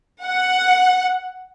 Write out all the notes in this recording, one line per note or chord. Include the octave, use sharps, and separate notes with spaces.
F#5